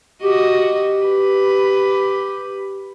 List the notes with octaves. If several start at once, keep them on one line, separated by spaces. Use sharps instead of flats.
F#4 G4 D#5
B4